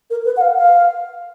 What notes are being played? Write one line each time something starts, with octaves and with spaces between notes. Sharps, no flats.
A#4
B4
F#5
F5
F5